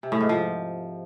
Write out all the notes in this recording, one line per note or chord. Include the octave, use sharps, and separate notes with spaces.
C3
A2
G#2
F3